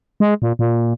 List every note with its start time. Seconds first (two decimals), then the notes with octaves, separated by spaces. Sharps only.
0.20 G#3
0.42 A#2
0.59 A#2